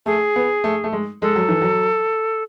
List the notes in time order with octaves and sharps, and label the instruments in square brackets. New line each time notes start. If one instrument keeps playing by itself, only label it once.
[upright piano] A3 [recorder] G#4
[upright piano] B3
A3
A3
G#3
[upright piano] G#3 [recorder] A4
[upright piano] F#3
E3
F#3